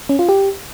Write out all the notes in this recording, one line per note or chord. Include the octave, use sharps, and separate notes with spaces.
C#4
F4
G4